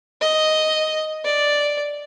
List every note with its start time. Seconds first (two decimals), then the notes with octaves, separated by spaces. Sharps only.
0.21 D#5
1.24 D5